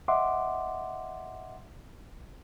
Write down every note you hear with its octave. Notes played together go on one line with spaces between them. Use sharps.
D#5 E5 F#5 C6 D6